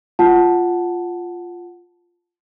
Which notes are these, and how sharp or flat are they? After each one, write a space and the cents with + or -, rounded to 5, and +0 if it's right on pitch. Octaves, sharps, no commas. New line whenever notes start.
F4 +0 F#5 +0 A5 -5